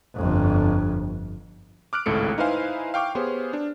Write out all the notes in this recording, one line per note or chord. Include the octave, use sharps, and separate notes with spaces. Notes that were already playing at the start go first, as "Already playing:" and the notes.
G1 F2
D6 F6 F#6 D7
G#1 C#2 A2 A4 C#7 D7
D#4 E4 B4 C5 F5 G#5
F5 G5 C#6 D6 F6
B3 G4 G#4 C5 C#5
D4